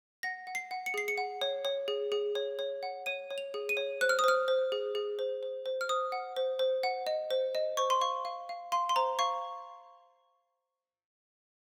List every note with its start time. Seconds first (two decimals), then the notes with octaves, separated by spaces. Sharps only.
0.23 F#5 A#6
0.47 F#5
0.55 C7
0.71 F#5
0.86 C#7
0.94 G#4 C7
1.08 C#7
1.18 F#5
1.41 C#5
1.65 C#5
1.88 G#4
2.12 G#4
2.35 C#5
2.59 C#5
2.83 F#5
3.06 C#5 D#7
3.30 C#5
3.38 F7
3.54 G#4
3.69 D#7
3.77 C#5
4.01 C5 F#6
4.09 F6
4.19 D#6
4.24 C5 F6
4.48 C5
4.72 G#4
4.95 G#4
5.19 C5
5.43 C5
5.66 C5
5.81 F6
5.89 C5 D#6
6.12 F#5
6.36 C5
6.59 C5
6.83 F#5
7.07 D#5
7.31 C5
7.55 D#5
7.77 C5 C#6
7.90 C6
8.01 F5 C#6
8.25 F5
8.49 F5
8.72 F5 C6
8.89 C6
8.96 C5 A#5
9.19 F5 C#6